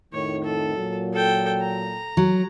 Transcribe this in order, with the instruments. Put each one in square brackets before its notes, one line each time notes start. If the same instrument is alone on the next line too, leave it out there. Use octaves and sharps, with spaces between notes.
[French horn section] F2 A2 D#3 [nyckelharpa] C#5
[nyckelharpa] A4
[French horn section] A#2 F#3
[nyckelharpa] A4 G5
A#5
[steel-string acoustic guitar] F#3